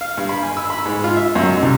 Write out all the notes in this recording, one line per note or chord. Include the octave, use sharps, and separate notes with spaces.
F5
G2
B5
G#5
E6
B5
G#2
F4
E5
F#2
D#4
C2